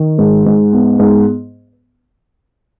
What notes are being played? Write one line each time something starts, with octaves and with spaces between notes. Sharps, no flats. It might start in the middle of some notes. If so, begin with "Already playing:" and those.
Already playing: D#3
G#2
G#2
B3
G#2